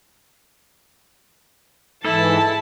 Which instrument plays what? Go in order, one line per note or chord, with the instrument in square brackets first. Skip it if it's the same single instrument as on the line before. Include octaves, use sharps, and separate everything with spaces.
[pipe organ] G#2 E3 [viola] E4 [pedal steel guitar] A4 [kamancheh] A5